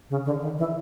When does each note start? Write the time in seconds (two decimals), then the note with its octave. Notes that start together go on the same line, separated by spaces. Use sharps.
0.10 C#3
0.25 D3
0.42 D#3
0.58 E3